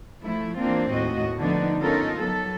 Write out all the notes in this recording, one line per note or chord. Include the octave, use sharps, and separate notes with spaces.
F3 A3 E4
E2 A#3 C4 D4 F4
D#2 A2 F#4 D#5
D3 F3 A3 B3 D4 D#4
B3 C#4 D#4 F4 A4 A#4
F#3 B3 A4